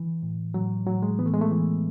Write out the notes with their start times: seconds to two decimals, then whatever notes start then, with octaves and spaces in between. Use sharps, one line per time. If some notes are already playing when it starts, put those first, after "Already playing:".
Already playing: E3
0.23 A2
0.54 A2 F#3
0.86 A2 F#3
1.02 G#3
1.19 E3 B3
1.26 A3
1.34 G#3
1.41 A3
1.51 E3